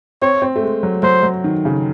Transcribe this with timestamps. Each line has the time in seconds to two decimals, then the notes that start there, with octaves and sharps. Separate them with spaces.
0.22 C4 C#5
0.42 C4
0.56 A3
0.63 G#3
0.83 F#3
1.03 F#3 C5
1.23 F#3
1.44 D#3
1.65 C#3